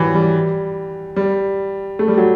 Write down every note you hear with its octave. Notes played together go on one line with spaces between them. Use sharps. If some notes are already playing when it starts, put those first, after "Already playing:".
Already playing: E3 F#3 G3
G3
G3
A3
G3
F#3